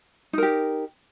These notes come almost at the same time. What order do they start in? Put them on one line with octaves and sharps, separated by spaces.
D#4 A#4 G4